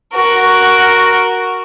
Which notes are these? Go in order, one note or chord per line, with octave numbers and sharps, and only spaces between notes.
F#4 A#4